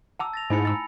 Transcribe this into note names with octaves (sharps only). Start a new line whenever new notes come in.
F#5 A5 A#5 D6 E6
A6 A#6 F7
G#2 A3 D#4 E4 G#5 B5 C#7
A#5 E6 A6